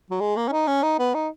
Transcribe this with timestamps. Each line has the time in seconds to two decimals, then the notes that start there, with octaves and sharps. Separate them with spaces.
0.10 F#3
0.20 G#3
0.36 A#3
0.48 C#4
0.52 D#4
0.67 C#4
0.83 D#4
0.99 B3
1.14 D#4